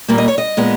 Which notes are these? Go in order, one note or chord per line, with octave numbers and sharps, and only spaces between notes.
A#2 G3 A#3
D#5
C#5
D#5
A#2 G#3 B3